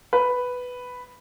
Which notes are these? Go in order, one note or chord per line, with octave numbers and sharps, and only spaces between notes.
B4